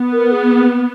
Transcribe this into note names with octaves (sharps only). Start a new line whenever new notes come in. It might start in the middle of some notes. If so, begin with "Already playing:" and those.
Already playing: B3
A#4
G#4